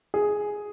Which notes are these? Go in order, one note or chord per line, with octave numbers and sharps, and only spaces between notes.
G#4